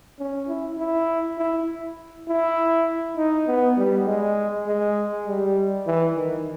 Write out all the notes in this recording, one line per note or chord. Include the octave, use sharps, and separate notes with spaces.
C#4
E4
E4
E4
E4
D#4
B3
G3
G#3
G#3
G3
E3
D#3